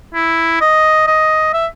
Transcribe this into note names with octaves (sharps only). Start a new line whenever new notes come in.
E4
D#5
D#5
E5